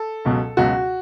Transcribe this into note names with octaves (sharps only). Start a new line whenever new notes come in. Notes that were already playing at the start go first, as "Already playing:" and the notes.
Already playing: A4
C#2 B2 F#3
C#2 B2 F#3 F#4